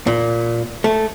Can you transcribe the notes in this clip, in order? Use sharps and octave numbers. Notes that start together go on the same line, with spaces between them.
A#2
A3